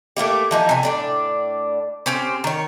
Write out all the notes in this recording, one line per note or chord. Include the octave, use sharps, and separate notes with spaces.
A3 A#3 E4 G4
E3 F3 D#4
C3 G#5
A2 D4 D5
C4 C#4 G4 C5
D#3 C#5